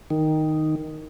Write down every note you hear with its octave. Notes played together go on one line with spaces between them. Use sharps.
D#3